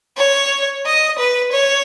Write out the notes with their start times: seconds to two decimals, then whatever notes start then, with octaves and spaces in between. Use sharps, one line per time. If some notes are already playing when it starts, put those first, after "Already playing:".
0.18 C#5
0.86 D#5
1.19 B4
1.52 C#5